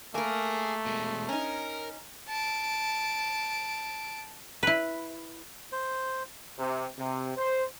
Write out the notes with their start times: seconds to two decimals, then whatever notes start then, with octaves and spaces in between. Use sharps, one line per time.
0.15 A3 A#3 G#4 A#4
0.86 B2 G#3
1.29 C#4 D#4 A#4
2.28 A5 D7
4.63 E4 B4
5.72 C5
6.59 C3
6.98 C3
7.37 C5